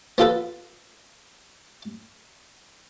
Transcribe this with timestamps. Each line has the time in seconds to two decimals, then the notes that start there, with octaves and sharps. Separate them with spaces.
0.18 B3 F4 A4 B4